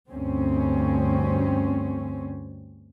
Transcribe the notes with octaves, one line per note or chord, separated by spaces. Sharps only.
D2 G2 C4 C#4